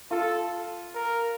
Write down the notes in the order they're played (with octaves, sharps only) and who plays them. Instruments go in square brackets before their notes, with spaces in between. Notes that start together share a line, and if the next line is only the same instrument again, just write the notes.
[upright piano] F4 [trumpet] A4
[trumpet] A#4